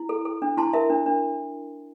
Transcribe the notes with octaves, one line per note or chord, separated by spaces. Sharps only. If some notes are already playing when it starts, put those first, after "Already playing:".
Already playing: E4
A4
A4
D4
E4 A5 C6
A#4 E5
D4
D4